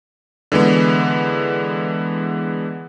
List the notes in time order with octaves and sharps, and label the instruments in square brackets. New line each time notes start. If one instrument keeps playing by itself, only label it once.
[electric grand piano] D3 E3 G#3 B3